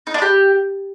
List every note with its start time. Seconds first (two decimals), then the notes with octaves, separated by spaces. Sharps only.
0.07 D#4
0.14 D4
0.22 G4